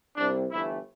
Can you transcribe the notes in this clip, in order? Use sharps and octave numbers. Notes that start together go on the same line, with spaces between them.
C2 C3 G3 D4
G1 G2 E3 A3 E4